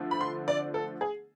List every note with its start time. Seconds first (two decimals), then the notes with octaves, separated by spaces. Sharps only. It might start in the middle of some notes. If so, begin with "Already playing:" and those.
Already playing: D3 F3 A3 C4
0.11 B5
0.21 C6
0.48 D5
0.74 A4
1.01 G#4